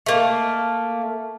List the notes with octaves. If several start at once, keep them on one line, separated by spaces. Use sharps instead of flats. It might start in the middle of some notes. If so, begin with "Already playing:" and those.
A3 A#3